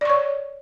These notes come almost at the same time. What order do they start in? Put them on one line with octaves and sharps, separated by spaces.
D5 C#6 C#5